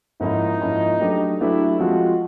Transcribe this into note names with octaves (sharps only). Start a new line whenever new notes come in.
G#2 F3 A#3 C#4 D#4 E4
G#2 F3 A#3 C#4 E4
F#3 A3 D4 G4 B4
F#3 A3 D4 E4 G4 B4
F3 G#3 C4 F4 F#4